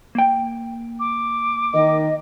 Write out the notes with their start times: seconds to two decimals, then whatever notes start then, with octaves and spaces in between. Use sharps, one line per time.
0.15 A#3 G5
1.00 D6
1.74 D#3 D#5